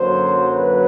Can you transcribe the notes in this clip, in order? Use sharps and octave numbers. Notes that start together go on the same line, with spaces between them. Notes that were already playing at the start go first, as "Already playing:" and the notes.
Already playing: F#2 D3 F#3 A#3 C5
B4